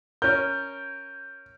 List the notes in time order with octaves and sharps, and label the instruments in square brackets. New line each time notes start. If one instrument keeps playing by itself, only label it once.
[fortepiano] C#4 A#4 [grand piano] G6